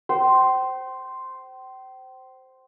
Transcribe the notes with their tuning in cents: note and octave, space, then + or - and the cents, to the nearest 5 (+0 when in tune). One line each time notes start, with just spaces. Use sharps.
C5 +0 G5 -35